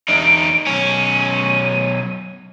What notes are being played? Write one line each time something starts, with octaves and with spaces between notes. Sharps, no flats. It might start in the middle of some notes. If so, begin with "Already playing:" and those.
E2 D#4 D7
B1 C#4 D#7